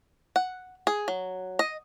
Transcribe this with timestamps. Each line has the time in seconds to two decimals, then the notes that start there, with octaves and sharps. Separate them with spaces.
0.36 F#5
0.87 G#4
1.08 F#3
1.59 D#5